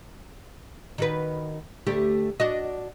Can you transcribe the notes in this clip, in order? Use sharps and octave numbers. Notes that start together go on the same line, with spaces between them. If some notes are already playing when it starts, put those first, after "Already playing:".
D#3 F#4 B4
D2 A3 G4
D4 F#4 D#5